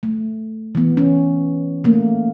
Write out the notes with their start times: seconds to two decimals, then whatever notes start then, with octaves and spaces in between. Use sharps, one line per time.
0.03 A3
0.75 E3 B3
0.97 C#4
1.84 A3 A#3